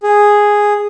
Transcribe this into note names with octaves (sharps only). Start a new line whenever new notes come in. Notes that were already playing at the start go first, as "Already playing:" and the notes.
G#4